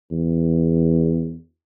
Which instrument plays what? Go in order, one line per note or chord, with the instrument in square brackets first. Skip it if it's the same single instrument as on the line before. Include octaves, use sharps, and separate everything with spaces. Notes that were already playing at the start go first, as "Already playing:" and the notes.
[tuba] E2